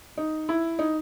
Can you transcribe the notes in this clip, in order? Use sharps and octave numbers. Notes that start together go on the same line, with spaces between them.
D#4
E4
D#4